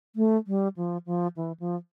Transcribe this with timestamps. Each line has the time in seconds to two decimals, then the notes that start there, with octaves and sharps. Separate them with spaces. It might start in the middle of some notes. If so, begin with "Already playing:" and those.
0.16 A3
0.47 G3
0.77 F3
1.06 F3
1.37 E3
1.60 F3